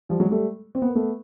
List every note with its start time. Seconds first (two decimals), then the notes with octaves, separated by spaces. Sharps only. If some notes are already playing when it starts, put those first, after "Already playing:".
0.09 F3 G3
0.20 F#3 G#3
0.31 G3 A3
0.75 C4
0.82 B3
0.88 A#3
0.95 A3 B3